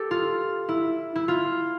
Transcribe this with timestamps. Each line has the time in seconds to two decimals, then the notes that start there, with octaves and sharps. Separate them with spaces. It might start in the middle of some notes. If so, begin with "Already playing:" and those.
Already playing: G4 A4
0.11 F4
0.69 E4
1.16 E4
1.28 F4